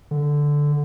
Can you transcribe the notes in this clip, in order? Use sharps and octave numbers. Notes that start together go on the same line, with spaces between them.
D3